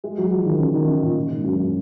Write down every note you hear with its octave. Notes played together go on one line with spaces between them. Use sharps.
G#3
F#3
F3
D#3
C#3
D#3
C#3
A#2
A#2
G#2
F#2